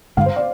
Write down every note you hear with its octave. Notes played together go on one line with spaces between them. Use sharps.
G2 D3 G#3 D4 F5
C5
D5